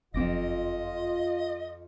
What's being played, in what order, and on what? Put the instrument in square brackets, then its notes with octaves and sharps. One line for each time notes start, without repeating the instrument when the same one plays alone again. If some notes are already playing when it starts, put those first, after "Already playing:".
[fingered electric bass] F#1 C4 [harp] F2 D6 A#6 [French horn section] F4 [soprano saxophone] D#5